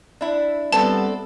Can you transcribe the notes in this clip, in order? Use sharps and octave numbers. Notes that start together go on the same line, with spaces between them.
D4 E4
G3 B3 C4 A4 D5 A5